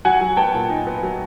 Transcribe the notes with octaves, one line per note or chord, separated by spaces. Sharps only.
F#3 F#5 G#5
F#3
B3 G5 A5
A#2
D#4
B3
F#3